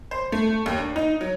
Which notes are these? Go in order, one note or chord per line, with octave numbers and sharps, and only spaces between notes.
C5
A3
D#2
D4
D#4
F#3